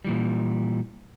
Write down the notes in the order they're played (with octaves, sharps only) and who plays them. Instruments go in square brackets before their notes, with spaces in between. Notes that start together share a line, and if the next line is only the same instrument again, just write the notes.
[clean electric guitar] A#2 E3 G3